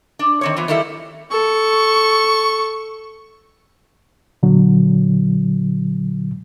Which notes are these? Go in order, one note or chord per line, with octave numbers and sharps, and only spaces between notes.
D4
D#3 C4 C#5
E3 F3 B3
D#3 G3 A#3 E4 A4
A4 C#6
A#2 D3 F#3